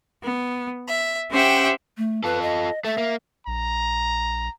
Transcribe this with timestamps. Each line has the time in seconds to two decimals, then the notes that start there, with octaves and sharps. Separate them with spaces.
0.23 B3
0.88 E5
1.31 C#4 G4 C5 E5 F#5 G5
1.98 A3
2.24 F4 A4 B4
2.42 D#5
2.84 A3 E5
2.98 A#3
3.47 A#1 A#5